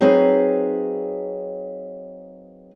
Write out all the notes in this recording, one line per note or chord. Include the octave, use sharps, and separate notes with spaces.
F#3 C4 D#4 G#4 B4 F5